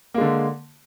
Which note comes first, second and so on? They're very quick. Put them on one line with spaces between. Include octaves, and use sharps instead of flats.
A#3 G#3 D3